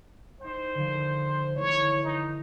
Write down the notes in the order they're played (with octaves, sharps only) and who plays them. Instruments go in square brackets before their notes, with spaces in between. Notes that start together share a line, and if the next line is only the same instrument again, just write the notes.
[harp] D#4 G5 [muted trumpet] C5
[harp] D3 D#3 F3
[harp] D3 E3 A3 [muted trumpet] C#5
[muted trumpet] D#4